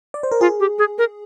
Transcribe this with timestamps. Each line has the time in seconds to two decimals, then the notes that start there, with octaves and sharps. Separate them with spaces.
0.14 D5
0.23 C5
0.31 A#4
0.41 F4 G#4
0.60 G4
0.79 G#4
0.98 A#4